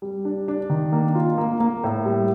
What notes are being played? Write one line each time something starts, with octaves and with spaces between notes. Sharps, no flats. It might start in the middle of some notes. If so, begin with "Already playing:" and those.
G3
D4
D4
D#3
A#3
F4
A#3
A#3
A2
G3